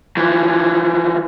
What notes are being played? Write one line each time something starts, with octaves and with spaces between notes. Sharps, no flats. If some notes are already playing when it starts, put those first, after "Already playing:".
E3 F3